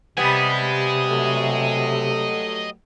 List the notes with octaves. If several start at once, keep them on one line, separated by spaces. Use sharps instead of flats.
C3 G3 B3 D#5 G#5
F#3 A3